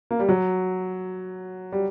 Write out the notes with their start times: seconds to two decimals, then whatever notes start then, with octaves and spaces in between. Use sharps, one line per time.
0.11 A#3
0.19 G3
0.29 F#3
1.72 G3